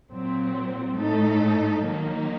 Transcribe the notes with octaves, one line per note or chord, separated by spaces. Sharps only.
A#2 F#3 C4
A2 A3 D#4 A4
D#3 F#3 A#3 D#4